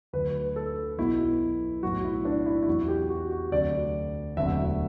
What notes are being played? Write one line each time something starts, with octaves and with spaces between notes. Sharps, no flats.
D2 D3 F#3 B4
A4
B1 B2 F#3 E4
B1 A2 F#3 F#4
E4
D4
E4
E4
E2 C3 F#3 F#4
G4
F#4
F#4
D2 C3 F#3 D5
E1 D2 C3 F#3 E5